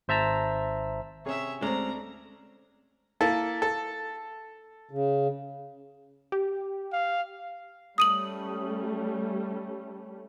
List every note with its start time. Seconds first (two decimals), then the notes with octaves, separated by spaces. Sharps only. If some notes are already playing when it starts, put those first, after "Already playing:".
0.08 G#1 C5 E5 A5 A#5 E6
1.26 C3 C#4 G#4 C#5 E5
1.62 D2 G#3 C4 C#4 A4 D5 A#5
3.21 A#3 E4 A4
3.62 A4
4.91 C#3
6.32 G4
6.93 F5
7.98 G3 A3 C#4 D#6 D#7 F#7